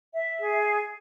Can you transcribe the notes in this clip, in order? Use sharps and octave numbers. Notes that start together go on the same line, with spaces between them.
E5
G#4